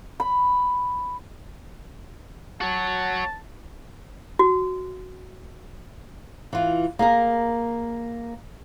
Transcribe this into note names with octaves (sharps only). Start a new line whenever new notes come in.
B5
F#4 C#5 A5
F#4
E3 F4
A#3 G#4 A#4